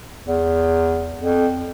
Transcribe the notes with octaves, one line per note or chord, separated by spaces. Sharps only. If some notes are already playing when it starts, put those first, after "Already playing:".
E2
F2